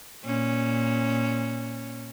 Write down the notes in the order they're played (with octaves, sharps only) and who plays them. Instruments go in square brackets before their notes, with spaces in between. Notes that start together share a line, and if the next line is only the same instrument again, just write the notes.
[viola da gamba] A#2 C#4